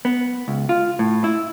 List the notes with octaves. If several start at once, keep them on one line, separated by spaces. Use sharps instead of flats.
B3
C#2
F4
A2
E4